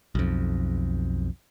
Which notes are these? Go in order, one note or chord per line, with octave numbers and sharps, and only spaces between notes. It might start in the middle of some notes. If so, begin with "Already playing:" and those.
B1 F2